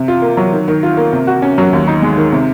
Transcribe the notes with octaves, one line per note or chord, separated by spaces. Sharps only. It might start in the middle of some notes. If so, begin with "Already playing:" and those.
Already playing: C3
F4
A#3
F#3
D#3
D#3
F4
A#3
C3
F#4
C#4
F#3
D#2
D#4
G#3
D#3
C3